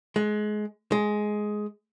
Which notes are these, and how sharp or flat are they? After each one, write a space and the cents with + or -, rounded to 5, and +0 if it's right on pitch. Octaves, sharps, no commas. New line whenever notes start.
G#3 +25
G#3 +10